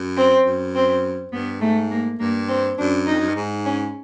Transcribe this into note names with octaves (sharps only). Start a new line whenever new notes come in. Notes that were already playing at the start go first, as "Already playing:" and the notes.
Already playing: F#2
C4
F#2
C4
G2 B3
G#2 A3
A#3
G2 A#3
C4
F#2 D4
D#4
F2
F#2
G2
G#2
C#4